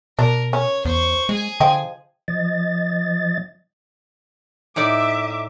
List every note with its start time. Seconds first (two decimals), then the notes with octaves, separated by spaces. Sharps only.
0.19 B2 D4 A#4
0.53 C#4 C#5
0.85 E2 C5 C#6
1.29 G#3 G#4 G#5
1.60 D3 F3 D#5 G5
2.28 F3 D#5 A6
4.76 A2 D#4 D5 E5 D6